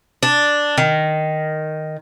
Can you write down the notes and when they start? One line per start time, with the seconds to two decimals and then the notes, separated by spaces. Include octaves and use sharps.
0.23 D4
0.78 D#3